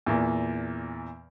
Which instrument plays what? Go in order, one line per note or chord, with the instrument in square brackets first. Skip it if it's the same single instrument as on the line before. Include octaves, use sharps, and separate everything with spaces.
[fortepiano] E2 A#2